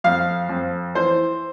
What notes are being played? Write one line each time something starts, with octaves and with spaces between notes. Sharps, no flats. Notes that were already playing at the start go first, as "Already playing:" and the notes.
F2 F5
F2
E3 C5